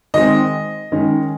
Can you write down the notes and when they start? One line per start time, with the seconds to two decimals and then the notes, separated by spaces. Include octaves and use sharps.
0.14 D#3 G#3 C4 D#5
0.92 D#3 G#3 C#4